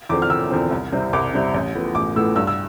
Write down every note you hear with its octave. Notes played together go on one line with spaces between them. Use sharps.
E2 D3 F3 C4 D6
F6
E1 E6
E2 D3 F3 C4
C2
C3 G3 C4 E4
C2 D6
C3 G3 C4 E4
A1
A2 F3 B3
A1 D6
A2 F3 B3 E6
G2 E6
E6